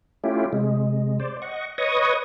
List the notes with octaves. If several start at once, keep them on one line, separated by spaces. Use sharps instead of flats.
A3 C#4 E4 F4 G4
C3 G#3
C5 D5
D#5 F#5 C#6
B4 C#5 D#5 C#6 D#6